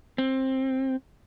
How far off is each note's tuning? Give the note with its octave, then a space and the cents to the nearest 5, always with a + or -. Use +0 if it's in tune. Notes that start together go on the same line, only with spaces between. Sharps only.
C4 +15